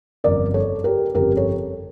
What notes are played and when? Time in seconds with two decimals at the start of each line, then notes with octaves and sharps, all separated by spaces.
0.24 G1 F2 C#3 A#4 D5
0.54 A4 C#5
0.84 G4 A#4
1.14 G1 F2 C#3 G4 A#4
1.37 A4 C#5